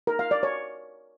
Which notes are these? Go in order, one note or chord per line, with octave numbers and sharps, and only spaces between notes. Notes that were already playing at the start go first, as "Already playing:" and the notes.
A#4
F5
D5
C#5